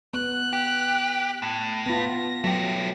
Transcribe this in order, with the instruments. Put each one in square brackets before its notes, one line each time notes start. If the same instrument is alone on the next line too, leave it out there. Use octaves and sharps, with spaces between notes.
[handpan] B3 [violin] F#6
[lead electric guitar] G4
A2
[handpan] B3 F4 [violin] A#6
[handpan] F#3 [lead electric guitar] A3 G4